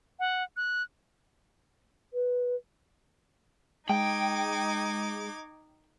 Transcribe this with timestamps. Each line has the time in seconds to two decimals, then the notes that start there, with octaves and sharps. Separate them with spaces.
0.19 F#5
0.57 F#6
2.13 B4
3.89 G#3 D#4 G5 D6 G#6